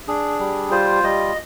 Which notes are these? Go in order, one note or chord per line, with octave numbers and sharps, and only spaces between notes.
D4 G#4
G3
F4 C5
G3 D#5